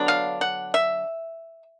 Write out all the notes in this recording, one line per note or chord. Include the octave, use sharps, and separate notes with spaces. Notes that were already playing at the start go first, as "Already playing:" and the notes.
Already playing: D3 F#3 B3 D4
F5
F#5
E5